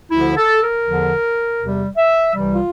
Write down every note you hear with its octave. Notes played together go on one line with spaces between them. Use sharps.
D2 D3 F3 E4
A4
A#4
E2 D3 F3
E2 C3 G3
E5
C2 C3 E3 G3
F4